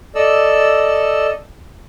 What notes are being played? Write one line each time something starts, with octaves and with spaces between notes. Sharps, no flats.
A4 D5 D#5 E6